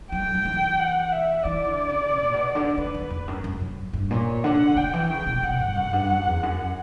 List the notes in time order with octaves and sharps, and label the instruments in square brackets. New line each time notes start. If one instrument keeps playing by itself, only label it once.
[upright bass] F#3 [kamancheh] G5
[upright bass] F#3
E3
[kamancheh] F#5
E5
[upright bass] E3 [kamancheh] D5
[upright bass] D3
C#3
B2
A#2
B2
D3
[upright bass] D3 [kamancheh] B4
[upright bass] E2
E2
F#2
F#2
F#2
G2
[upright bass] A#2 [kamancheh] C#5
[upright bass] D3 [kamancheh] F#5
[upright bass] D3 [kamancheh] G5
[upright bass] E3
[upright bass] C#3 [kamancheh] G5
[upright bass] B2
[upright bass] B2 [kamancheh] F#5
[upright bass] G2
F#2
G2
F#2
E2
F#2